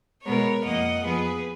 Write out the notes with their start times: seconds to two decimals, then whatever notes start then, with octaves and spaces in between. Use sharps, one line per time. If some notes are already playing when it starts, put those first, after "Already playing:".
0.25 B2 G#3 B3 A#4 C#5
0.64 F2 F3 A#3 D#5 F#5
1.04 F2 F3 B3 G#4 B4